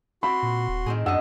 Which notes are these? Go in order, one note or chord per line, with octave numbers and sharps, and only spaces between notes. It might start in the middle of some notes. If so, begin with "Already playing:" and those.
C4 F#4 B5 C6
A#2
D#1
A2 D#3 C4 G#4
F#2 D4 D#5 F#5 E6